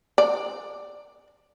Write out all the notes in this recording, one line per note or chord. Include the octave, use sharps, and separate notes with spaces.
D5